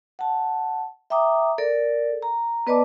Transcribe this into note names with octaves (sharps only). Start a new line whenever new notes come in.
F#5 A5
E5 G5 A#5 D6 D#6
A4 A#4 D5
A#5
B3 B4 D5 D#5 A5 D6